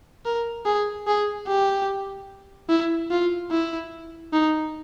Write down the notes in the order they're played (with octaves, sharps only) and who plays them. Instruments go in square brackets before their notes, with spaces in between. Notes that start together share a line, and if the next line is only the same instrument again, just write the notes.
[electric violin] A#4
G#4
G#4
G4
E4
F4
E4
D#4